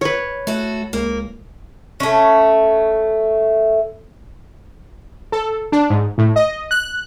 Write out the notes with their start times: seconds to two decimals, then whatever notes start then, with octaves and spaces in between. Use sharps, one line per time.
0.01 B4 C#5
0.47 A3 F#4 A4
0.93 C#2 A#3
2.00 A3 C#4
5.32 A4
5.72 D4
5.90 G#2
6.18 A2
6.36 D#5
6.71 F#6